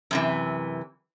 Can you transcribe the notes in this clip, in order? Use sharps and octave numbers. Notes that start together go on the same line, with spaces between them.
F#2 C3 E3